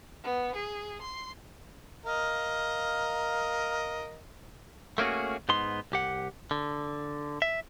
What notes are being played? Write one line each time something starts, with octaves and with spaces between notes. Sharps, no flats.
B3
G#4
C6
A#4 D#5 F5
A3 A#3 C#4 F#4 G#4
G#2 B3 D#4 C6
C2 G4 F#5
D3
E5